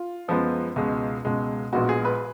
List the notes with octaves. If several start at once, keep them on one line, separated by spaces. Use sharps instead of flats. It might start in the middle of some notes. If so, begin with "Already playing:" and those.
Already playing: F4
F#2 F3 G#3 B3
C#2 B2 G#3
C#2 B2 G#3
A#1 A#2 G#3 B3 F#4
G#4
B4